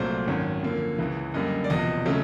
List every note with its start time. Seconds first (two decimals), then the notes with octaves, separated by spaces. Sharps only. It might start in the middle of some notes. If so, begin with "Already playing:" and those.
Already playing: C2 A#2 F#3 A3 C5
0.27 G#1 F#2 D#3 C#5
0.63 F#2 D3 F3 A#3
0.98 C#2 C#3 E3
1.34 F#2 D3 G3 A#3 D#5
1.64 D5
1.70 E1 E2 C3 F3 D#5
2.06 C#3 F#3 A3